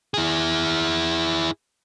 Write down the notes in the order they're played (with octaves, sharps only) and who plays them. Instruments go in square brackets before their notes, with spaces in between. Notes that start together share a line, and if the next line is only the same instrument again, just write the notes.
[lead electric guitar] E4 G#4